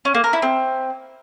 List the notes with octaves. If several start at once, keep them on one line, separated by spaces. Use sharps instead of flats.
C#4
A#3
A#4
E4
C4